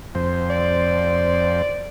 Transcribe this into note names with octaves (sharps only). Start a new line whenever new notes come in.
F2 C5
D5